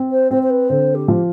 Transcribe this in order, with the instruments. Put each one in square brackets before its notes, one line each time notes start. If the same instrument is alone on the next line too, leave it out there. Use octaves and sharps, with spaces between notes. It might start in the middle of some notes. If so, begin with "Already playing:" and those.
Already playing: [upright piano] C4
[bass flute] C5
[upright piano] C4 [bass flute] C5
[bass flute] C5
B4
[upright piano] D3 [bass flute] C5
[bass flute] G4
[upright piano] F3